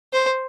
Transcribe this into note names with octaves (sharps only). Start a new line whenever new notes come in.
C5